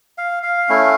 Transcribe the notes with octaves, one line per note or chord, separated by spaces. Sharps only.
F5
F5
A3 C#4 E4